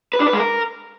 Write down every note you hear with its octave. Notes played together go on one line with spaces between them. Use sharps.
B4
D4
B4
G#3
A#4